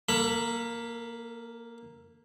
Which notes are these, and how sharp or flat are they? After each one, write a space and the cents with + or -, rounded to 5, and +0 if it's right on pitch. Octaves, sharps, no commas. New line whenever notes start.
A#3 +0 A4 +35 B5 +0